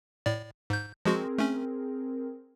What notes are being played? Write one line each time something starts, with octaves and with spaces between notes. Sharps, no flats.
A2 D5
G#2 G6
F3 G#3 C4 F#4 G#4 A#4
A3 C#4